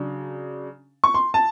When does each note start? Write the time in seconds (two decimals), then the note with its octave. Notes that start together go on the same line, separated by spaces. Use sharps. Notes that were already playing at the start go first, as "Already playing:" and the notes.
Already playing: C#3 F#3 D4
1.04 C#6
1.14 C6
1.34 A5